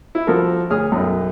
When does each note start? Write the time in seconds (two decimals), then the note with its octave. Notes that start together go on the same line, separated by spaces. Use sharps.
0.15 E4
0.27 F3 F#4 A4 A#4
0.70 D2 G#4 C#5 D#6 F6
0.92 B1 F#2